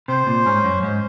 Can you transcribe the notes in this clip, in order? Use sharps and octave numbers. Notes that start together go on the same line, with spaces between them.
C3 C5
A#2
G#2 C#4
F#2
G#2 C5